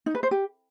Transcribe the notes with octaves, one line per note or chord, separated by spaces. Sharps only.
D#4
B4
C5
G4